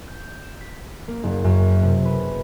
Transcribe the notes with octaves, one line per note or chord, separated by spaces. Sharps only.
G6
E7
B6
A#3
F#1
F#2
C3
B4